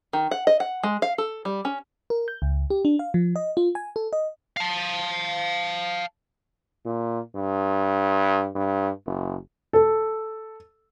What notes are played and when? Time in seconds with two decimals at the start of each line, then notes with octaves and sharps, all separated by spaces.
0.13 D#3
0.31 F#5
0.47 D#5
0.60 F#5
0.83 G#3
1.02 F5
1.18 A4
1.45 G3
1.65 C#4
2.10 A#4
2.28 G6
2.42 C#2
2.70 G4
2.85 D4
2.99 F5
3.14 F3
3.36 D#5
3.57 F4
3.75 G#5
3.96 A4
4.13 D#5
4.57 F5 A5
6.86 A#2
7.36 G2
8.55 G2
9.06 F#1
9.73 A4